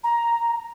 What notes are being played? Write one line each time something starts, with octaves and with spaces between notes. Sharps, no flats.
A#5